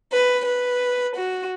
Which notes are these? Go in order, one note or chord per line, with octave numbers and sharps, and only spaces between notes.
B4
B4
F#4